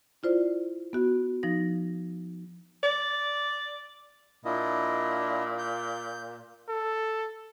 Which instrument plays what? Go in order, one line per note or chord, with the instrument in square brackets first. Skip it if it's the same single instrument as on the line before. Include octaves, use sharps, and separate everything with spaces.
[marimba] E4 F4 C5 D5
B3 F#4
F3 D#4 A#6
[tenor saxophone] D5
[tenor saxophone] A#2 [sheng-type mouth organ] D4 E4 D#5
[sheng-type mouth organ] G6
[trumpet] A4